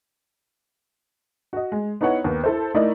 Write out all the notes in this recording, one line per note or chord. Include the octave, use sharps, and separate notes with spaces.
F#4 D#5
G#3
B3 D#4 E4 C#5 F#5
D#2 B3
E4 A4 C5
A3 D#4 E4 A#4 D5 D#5